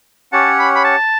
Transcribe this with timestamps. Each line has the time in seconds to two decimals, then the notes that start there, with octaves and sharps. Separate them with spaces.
0.32 C#4 G4 C#5 F#5 A5
0.59 B5
0.75 B5
0.84 A5